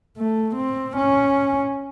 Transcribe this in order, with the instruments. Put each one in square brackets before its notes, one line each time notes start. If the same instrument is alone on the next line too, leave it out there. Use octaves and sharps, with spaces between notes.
[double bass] A3
C4
C#4